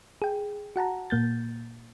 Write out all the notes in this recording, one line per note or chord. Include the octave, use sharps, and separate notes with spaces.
G#4 G5
F#4 F#5 A5 A#5
A#2 A#3 G6 A6